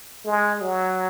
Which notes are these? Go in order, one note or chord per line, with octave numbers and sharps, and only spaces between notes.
G#3
F#3